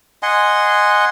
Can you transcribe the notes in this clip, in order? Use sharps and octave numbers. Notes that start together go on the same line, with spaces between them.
D#5 F#5 G#5 C6